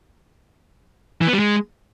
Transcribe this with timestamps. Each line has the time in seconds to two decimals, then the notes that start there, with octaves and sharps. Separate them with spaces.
1.21 E3
1.27 B3
1.33 G3
1.39 G#3